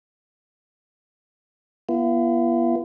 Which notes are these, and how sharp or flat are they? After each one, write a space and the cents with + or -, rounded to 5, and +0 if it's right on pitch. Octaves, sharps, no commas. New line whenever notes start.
B3 -35 E4 +45